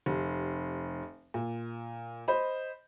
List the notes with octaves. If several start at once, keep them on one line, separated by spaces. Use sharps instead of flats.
F1
A#2
C5 D#5 B5